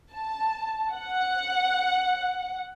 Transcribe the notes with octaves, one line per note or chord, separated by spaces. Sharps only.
A5
F#5